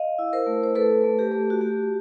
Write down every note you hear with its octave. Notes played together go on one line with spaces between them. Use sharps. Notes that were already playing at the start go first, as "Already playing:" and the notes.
Already playing: D#5 F5
E4
A#4 C5
A3
C5
A3 A4 B4
A3
G4
A3
F#4
A3 G4